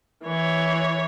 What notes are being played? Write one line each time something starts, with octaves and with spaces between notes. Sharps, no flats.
E3 C#5